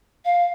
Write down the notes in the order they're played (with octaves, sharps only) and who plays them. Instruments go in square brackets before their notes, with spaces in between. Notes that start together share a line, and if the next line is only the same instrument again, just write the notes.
[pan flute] F5